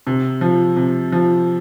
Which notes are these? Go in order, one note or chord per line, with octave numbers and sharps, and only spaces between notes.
C3
F3
C3
F3